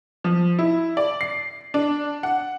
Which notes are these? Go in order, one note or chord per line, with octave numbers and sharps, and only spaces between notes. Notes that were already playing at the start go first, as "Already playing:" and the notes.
F3
E4
D5
C7
D4
F#5